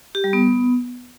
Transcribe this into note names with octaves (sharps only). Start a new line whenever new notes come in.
G4
G3
B3